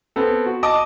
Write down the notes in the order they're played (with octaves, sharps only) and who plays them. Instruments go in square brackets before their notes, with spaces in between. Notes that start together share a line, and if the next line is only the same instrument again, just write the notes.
[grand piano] B3 C4 A4
F#4
D#5 A5 D6 D#6